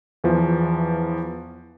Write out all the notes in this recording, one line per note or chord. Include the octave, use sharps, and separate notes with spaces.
E2 E3 F3